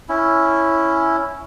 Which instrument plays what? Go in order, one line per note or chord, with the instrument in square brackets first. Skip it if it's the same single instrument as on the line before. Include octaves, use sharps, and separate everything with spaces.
[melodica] C#4 E4